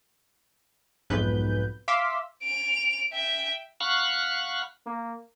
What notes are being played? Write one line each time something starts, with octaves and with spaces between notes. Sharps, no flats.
B1 F2 G#2 B3 B4 G6
E5 F5 C6 D6 E6 B6
D7 F7
E5 G5
F5 F#5 B5 C#6 F6 F#6
A#3